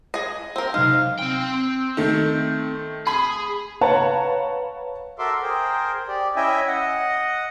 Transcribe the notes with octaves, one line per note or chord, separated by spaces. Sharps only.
G#4 D#5
C4 A#4
C3 F#3 G#3 D#4 F5
C4 G5
D#3 A3
G#4 B5
B4 C#5 F5 F#5 A5 A#5
F#4 A4 A#4 E5 C6 D6
G#4 A#4 C5 G5
G4 D5
C#4 E4 D#5 E5 G5 G#5
D#5 F#5